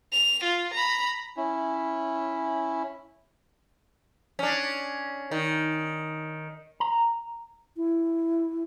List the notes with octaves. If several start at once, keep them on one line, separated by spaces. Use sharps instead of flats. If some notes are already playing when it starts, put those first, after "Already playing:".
F7
F4
A#5 B5
C#4 E4
C#4 D4
D#3
A#5
E4